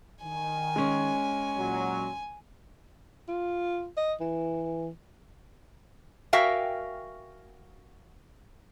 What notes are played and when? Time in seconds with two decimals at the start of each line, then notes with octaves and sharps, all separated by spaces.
0.24 D#3 G#5
0.76 G#3 C#4
1.57 A#2 F#3
3.28 F4
3.97 D#5
4.20 E3
6.33 F#4 A#4 E5 F5 G5 G#5